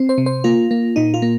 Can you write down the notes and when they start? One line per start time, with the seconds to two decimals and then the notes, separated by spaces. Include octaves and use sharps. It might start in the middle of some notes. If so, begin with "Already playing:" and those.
Already playing: C4
0.09 C5
0.18 C3
0.26 C5
0.44 A#3 F4
0.71 A#3
0.96 A#2 D#4
1.14 F4
1.22 A#3